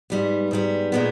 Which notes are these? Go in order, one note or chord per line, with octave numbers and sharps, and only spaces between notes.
G#2 G3 B3
G#2 G3 B3
A#2 G#3 B3